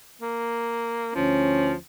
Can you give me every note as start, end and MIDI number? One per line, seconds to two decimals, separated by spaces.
0.21 1.13 58
1.15 1.73 38
1.15 1.75 53
1.15 1.73 61